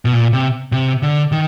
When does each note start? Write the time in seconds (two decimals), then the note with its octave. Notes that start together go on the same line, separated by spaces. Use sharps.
0.05 B2
0.13 A#2
0.33 C3
0.72 C3
1.02 D3
1.32 D#3